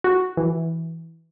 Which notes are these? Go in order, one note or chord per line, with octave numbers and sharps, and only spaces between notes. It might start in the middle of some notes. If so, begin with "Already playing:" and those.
F#4
E3